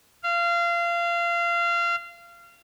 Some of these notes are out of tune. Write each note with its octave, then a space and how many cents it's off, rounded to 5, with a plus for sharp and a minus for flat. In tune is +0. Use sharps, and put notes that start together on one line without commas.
F5 -25